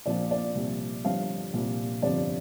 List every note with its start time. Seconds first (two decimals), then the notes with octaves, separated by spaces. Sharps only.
0.06 A#1 A#2 F3 D5
0.31 D5
0.55 C2 A#2 F3
1.04 G1 G2 D3 F3 F5
1.54 C2 A#2 F3
2.02 G1 F2 C3 F3 D5